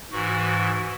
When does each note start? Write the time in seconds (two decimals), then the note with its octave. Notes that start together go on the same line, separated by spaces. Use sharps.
0.12 G#2 E3 F#4